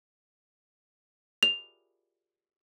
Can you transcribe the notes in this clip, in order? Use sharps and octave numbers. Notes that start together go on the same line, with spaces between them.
F7